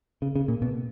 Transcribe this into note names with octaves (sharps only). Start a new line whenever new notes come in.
C#3
C#3
A#2
B2